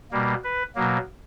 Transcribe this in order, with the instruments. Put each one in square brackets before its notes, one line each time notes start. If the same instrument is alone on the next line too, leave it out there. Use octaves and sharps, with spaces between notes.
[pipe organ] B2 G3 A#3
B4
B2 F#3 A#3